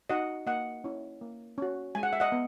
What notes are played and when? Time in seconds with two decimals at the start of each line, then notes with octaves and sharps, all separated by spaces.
0.10 D#4 F#4 D#5 F#5
0.46 A#3 D#5 F#5
0.84 C#4 E4
1.22 A#3
1.58 C#4 F#4
1.95 G#3 G#5
2.03 F#5
2.13 E5
2.20 D#5 F#5
2.32 B3